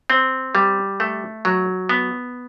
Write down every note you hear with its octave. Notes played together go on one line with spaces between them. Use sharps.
C4
G3
A3
F#3
B3